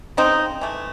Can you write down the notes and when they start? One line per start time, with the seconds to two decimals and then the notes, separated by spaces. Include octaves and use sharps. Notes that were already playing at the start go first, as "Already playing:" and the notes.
0.17 C#3 C4 D#4
0.61 E3 A3